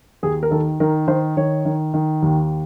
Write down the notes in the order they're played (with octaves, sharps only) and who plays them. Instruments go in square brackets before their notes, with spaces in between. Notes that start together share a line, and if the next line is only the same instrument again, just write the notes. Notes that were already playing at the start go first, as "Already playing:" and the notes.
[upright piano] D#2 G#4
A#4
D#3 A4
D#3 A#4
D#3 C5
D#3 C#5
D#3
D#3
D#2